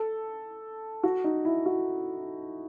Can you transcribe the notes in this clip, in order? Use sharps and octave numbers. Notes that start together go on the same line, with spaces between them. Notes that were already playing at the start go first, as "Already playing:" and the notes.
Already playing: A4
F#4
D#4
E4
F#4